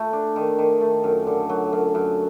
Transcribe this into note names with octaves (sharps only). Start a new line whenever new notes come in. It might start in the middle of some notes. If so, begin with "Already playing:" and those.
Already playing: A3
D4
D#3
D#3
A3
F#2
D3
F#3
F#2
F#2